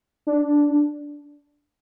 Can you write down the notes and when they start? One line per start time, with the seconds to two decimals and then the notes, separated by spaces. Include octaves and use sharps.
0.27 D4